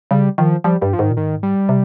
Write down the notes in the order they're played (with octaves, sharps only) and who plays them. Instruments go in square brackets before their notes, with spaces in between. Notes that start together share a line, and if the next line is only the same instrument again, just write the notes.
[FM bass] C#3 [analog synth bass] G3
[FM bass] D#3 [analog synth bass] F3
[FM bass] F3 [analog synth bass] G3
[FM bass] G2 [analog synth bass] G3
[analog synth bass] F3
[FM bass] G#2 [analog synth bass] D#3
[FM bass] A#2
[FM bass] G#2 [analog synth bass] D#3
[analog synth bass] G3
[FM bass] C3